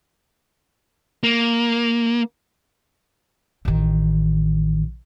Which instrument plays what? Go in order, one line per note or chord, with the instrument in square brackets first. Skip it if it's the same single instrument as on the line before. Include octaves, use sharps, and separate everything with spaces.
[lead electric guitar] A#3
[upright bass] A1 D#3